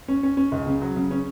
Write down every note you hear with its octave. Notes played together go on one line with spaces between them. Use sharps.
C#4
C#4
C#4
C#2
C#3
F#3
C#3
C#4